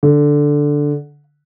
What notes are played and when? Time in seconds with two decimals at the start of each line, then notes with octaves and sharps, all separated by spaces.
0.03 D3